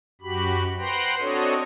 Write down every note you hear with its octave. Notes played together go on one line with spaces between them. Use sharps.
F#2 F#4 G4 B5
B4 C5 F#5 G5 A#5 C6
C4 D4 F#4 A4 C#5 D#5